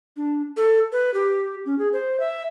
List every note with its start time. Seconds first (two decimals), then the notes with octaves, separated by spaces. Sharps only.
0.17 D4
0.57 A4
0.92 B4
1.14 G4
1.66 C#4
1.79 G#4
1.93 C5
2.20 E5